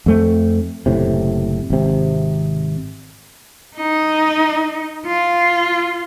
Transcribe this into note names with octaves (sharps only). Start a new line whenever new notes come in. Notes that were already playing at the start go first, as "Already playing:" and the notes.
F2 A3 C4
F#1 A2 C3
G#1 C3
D#4
F4